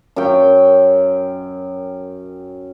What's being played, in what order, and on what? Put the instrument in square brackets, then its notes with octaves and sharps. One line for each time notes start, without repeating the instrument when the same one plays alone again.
[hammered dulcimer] F#2 G5